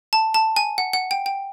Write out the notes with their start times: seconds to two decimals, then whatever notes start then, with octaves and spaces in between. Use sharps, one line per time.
0.13 A5
0.34 A5
0.56 G#5
0.78 F#5
0.93 F#5
1.11 G5
1.26 G5